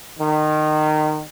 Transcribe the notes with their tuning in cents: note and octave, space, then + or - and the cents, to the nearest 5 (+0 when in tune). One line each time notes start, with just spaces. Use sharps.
D#3 -25